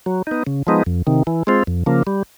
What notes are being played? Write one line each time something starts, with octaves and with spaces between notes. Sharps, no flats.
F#3
B3 D#4
C#3
F3 G#3 B3 D#4
F2
C3 D#3
E3
G#3 C4 F4
F2
C#3 F3 A#3
G3